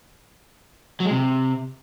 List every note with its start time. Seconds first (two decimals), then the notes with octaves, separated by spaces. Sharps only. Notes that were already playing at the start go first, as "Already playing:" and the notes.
1.00 F#3
1.05 G#3
1.11 C3